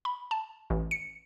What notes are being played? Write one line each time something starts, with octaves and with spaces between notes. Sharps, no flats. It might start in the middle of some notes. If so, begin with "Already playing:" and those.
B5
A5
A1
C#7